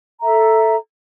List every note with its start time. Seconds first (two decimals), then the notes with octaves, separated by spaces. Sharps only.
0.21 A4 E5 A#5